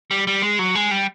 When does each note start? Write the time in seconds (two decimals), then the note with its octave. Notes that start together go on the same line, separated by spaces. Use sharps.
0.11 G3
0.27 G3
0.42 G#3
0.59 F#3
0.75 G#3
0.91 G3